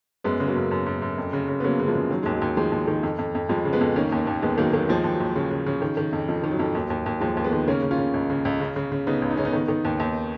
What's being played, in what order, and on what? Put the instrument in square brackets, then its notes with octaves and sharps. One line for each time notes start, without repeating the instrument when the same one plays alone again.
[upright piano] F#2 G#3 B3
C#3
F#3 A#3
F#2
F#2
F#2
F#2
F2
C#3
C#3
B3
C#3 F#3 A#3
C#3
F3 G#3
C#3
D#3 F#3
D#2 G#3
F#3
D#2
D#3 F3 G#3
D#2
D#3
F2
F2
F2
F2 F3 G#3
C#3
G#3 B3
F2
D#3 A#3 C#4
D#2
D#2
D#2 G#3 B3
D#3 F#3 A#3
D#3 F#3 A#3
D#2 F3 G#3
D#2
F#3
D#2
C#3
C#3
C#3
D#3
D#3
F2
F2 F3
D#3
F#3
F2
D#2
D#2
D#2
D#2 F3 G#3
D#2
G#3 B3
D#3
C#3 A#3 C#4
C#3
C#4 F4
C#3
C#2
C#3
C#2
C#3
C#3
C#3
C#3 B3 D#4
C#2
D#4
C#3 C#4
B3 D#4
D#3
D#3
D#2
D#2